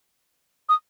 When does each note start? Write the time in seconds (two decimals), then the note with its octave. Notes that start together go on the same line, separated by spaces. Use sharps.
0.69 D#6